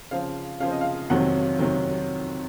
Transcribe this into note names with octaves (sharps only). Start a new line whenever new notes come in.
C#3 F3 C4 F5
C#3 F3 C4 F5
D#5
F5
F2 C3 D#3 F#3 F#5
C3 D#3 F#3